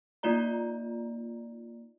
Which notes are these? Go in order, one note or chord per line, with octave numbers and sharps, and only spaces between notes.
A#3 D#4 F4 D5 A#5